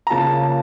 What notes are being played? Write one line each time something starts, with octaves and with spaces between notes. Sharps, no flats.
A#5
C#3 F3 A#3 C#4 A5